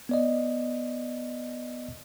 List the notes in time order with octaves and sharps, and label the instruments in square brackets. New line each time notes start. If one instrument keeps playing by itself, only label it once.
[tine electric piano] B3 D5 D#5